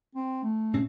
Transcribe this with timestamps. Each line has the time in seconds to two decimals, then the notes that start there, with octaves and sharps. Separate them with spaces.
0.15 C4
0.43 A3
0.73 A#2 C4 C#4